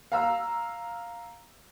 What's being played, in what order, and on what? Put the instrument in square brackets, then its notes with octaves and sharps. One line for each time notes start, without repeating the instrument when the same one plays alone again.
[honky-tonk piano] F5 A#5 E6